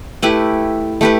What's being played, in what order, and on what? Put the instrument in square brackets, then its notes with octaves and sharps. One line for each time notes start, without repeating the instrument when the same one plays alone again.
[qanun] A3 E4 G4 B4
A3 E4 G4 B4